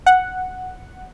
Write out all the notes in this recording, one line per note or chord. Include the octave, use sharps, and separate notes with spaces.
F#5